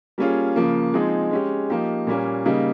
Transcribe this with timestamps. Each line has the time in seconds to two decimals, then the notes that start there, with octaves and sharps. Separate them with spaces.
0.18 G3 A#3 C#4 F4 G#4
0.56 C#3 F3 A#3
0.94 F3 G#3 C4 D#4 G#4
1.31 G#3 C#4 G4
1.70 F3 A#3 D#4 G4
2.07 A#2 G3 A#3 C#4
2.45 C#3 G3 A#3 D#4